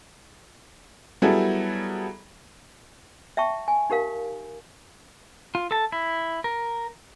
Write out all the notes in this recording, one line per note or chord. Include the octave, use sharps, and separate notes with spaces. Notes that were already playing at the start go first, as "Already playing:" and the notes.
F#3 G3 B3 E4 G#4 A4
E5 G5 A5 C#6
G#5
D#4 G4 A#4 F5
F4
A4 A5
E4
A#4